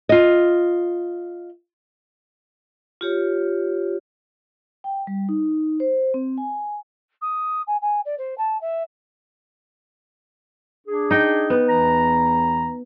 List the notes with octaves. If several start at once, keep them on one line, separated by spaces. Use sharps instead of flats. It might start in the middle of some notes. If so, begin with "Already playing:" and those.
F4 D#5
F4 G4 C#5
G5
G3
D#4
C5
C4
G#5
D#6
G#5
G#5
D5
C5
A5
E5
D4 G#4
D#4 G5
B3
E2 E3 A#5